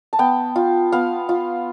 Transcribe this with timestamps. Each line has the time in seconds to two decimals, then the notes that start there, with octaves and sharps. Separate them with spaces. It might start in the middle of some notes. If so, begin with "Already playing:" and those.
0.13 A5
0.19 B3 G5
0.56 F4
0.92 B3 F5
1.29 F4